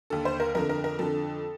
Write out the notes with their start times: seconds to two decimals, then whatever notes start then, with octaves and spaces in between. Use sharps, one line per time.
0.10 D#2 D3 A4
0.25 C5
0.40 A#4
0.55 F2 D3 A#4
0.69 A#4
0.84 A#4
0.99 F2 D3 A4